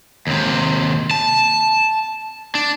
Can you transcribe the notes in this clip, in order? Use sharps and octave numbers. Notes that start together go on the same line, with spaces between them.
D#2 C3
A5
D4